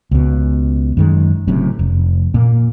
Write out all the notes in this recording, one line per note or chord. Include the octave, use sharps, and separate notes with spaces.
C#2 B2
F#2 D#3 G#3
F#1 F#2 A2 C3
F1
A#2 A#3